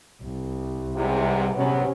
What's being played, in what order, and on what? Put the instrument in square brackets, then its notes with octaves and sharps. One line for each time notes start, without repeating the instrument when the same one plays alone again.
[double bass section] C2
[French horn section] E2 G#2 C3
[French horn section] E2 F#3 B3 [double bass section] C3 C#4